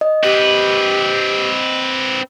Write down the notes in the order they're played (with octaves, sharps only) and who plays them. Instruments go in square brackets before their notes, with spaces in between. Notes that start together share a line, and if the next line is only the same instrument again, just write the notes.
[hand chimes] D#5
[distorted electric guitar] C4 B4 [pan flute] G4